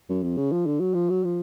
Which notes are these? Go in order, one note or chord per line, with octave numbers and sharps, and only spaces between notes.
F#2
F2
C#3
F3
D3
F#3
F3
F#3
F3